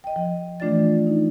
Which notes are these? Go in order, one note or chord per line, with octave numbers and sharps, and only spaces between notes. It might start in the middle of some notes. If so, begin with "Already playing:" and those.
D#5 G5
F3
E3 A3 D4 F4 D5 A6
D#4